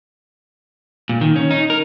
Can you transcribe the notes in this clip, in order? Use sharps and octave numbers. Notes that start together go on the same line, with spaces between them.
A#2
D#3
C#4
D#4
A#4